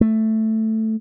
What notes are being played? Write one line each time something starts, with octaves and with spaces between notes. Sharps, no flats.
A3